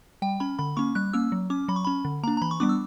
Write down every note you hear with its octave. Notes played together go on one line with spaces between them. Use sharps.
G3 G5
C#4 B5
D3 B5
A#3 C#4 C#6
G3 F#6
A#3 C#4 E6
F#3
C#4 D6
F#3 B5
C#6
C#4 B5
D3
A#3 D4 A#5
A#5
E3 B5
C#6
G3 B3 D4 D6
E6